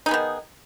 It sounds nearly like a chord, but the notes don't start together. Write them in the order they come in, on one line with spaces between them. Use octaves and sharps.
D#4 G#4 B3 D#3